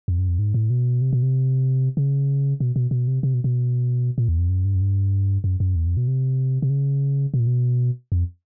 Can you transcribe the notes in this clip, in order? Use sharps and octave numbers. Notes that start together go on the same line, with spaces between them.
F2
F#2
F2
G#2
A2
B2
C3
B2
C3
C#3
B2
B2
B2
C3
C3
B2
B2
A#2
E2
F2
F#2
G2
F#2
G2
F#2
F#2
E2
F2
B2
C3
C3
C#3
B2
A#2
B2
F2